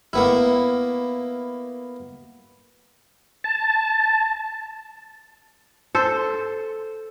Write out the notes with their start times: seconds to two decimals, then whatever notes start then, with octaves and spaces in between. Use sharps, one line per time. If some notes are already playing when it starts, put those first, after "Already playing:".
0.13 A#3 B3 E4
3.44 A5
5.95 A4 C5